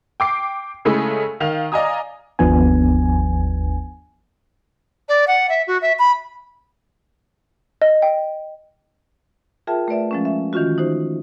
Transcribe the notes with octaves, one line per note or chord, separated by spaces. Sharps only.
G5 D6 C7
C#3 G#3 A3 E4 G#4 A4
D#3 F5 F7
D5 D#5 F5 G#5 A#5 D#6
G1 D#2 F3 B3 D4 G#5
D5
F#5
E5
F#4
E5
B5
D#5
G5
F4 G#4 A#4 E5 G5 A5
A3 B4 D5 E5
F3 G#3 C#4
E5
D#3 E3 C#4 F4 F#4
D#4 F#4 C5